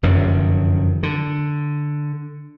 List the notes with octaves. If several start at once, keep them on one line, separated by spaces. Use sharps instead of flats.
F1 F#2 D3 D#3
D3